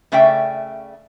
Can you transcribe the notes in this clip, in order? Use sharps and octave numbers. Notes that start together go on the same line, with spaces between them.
C#3 A3 D5 E5 G5